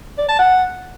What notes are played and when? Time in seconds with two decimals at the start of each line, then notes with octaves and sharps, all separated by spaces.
0.18 D5
0.28 A5
0.39 F#5